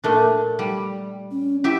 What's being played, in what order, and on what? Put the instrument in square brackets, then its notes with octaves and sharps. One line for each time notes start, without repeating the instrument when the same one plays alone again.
[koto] A#2 A3 D4
G3
[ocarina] C#4
[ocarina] E4 [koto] G4 E5